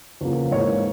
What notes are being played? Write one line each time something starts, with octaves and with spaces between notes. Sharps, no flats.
E2 C#3 F3 A#3
G#2 E3 A#3 C#5